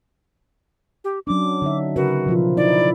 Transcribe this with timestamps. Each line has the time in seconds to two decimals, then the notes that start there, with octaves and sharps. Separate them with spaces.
1.04 G4
1.27 F#3 C#4 D4 D6
1.62 D3 D#4 E5
1.96 C#3 F#4 A#4 B4
2.26 B2 F3 F4
2.57 D#4 E4 D5